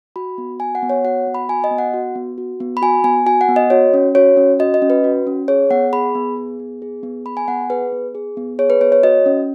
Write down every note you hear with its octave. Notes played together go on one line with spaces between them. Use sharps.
F#4 B5
B3
F#4 G#5
F#5
B3
C#5
F#4 F#5
B3
B5
F#4 G#5
D#5
B3
F#5
F#4
B3
F#4
B3
B5
F#4 G#5
B3 G#5
F#4 G#5
F#5
B3
D#5
F#4 C#5
C#4
F#4 C#5
C#4
F#4 D#5
D#5
C#4
B4
F#4
C#4
G#4 C#5
B3 F#5
G#4 B5
B3
G#4
B3
G#4
B3
G#4 B5
G#5
B3 F#5
G#4 B4
B3
G#4
B3
G#4 C#5
B4
B3 C#5
C#5
F#4 D#5
C#4